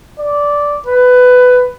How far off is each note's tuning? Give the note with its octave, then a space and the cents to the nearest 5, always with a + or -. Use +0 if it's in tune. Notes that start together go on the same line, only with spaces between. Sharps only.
D5 -10
B4 +15